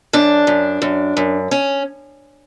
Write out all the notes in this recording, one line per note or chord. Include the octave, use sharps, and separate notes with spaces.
F#2 D4
F#2
F#2
F#2
C#4